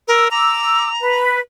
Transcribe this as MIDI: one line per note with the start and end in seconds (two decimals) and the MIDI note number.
0.08 0.28 70
0.08 0.26 88
0.31 1.21 82
0.31 0.89 86
0.31 0.89 88
1.02 1.40 71